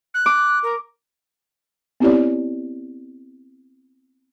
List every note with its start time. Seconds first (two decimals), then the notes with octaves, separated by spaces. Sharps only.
0.14 F#6
0.26 D6
0.62 A#4
2.00 B3 C4 E4 G4 C#5 D5